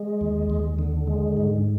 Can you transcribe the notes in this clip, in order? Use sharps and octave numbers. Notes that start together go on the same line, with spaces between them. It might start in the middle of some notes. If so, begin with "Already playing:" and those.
Already playing: G#3
D#2
D#2
D3
G#3
G#2